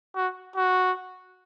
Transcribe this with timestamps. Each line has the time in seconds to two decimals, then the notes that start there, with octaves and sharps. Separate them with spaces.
0.15 F#4
0.56 F#4